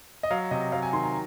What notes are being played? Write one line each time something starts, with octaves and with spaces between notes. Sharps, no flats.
D#5
F#3 F5
C3 D#5
F#3 F5
G#5
D#3 C6
A#5